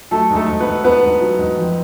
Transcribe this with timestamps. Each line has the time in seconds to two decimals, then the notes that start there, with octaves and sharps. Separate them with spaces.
0.11 F#3 A3 A4
0.30 G#2
0.36 A3 A4
0.48 G#2
0.60 B3 B4
0.66 G#2
0.84 G#2 B3 B4
1.03 G#2
1.21 F#3
1.39 G#2
1.57 F2